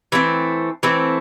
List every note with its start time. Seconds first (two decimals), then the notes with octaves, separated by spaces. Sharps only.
0.12 E3 A3 C4
0.83 E3 A3 C4